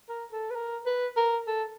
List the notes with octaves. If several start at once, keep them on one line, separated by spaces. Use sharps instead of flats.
A#4
A4
B4
A#4
B4
A#4
A4